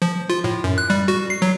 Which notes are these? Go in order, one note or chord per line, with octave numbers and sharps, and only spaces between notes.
F3
F4
A2
F#2
F#6
G3
F#4
C7
F#3